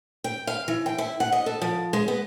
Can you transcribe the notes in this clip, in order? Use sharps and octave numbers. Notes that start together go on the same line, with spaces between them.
G5
F5
E3
G5
E4
F#5
D#5
A4
F3
G#3
B3